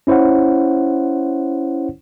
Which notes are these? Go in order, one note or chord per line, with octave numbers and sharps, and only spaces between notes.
C#4 E4 C5 C#5 F#5